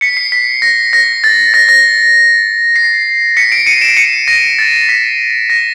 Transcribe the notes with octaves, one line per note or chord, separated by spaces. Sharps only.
B6 C#7
C7
B6
A#6
A#6
A6
A#6
A#6
C7
B6 C#7
C7 D7
C#7 D#7
D7 E7
C#7 D#7
A#6
A6
B6
A#6